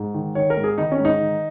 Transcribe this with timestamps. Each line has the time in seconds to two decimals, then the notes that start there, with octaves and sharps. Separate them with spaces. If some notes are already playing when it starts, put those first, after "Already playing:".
Already playing: G#2
0.14 D#3
0.35 D#3 C#5
0.50 A#4
0.57 G#2
0.64 G#4
0.78 D#3 D#4
0.91 C#4
1.00 G#2 D#4
1.21 D#3